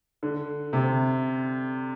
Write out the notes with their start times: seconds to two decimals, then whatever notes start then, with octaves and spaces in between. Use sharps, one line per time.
0.23 D3
0.73 C3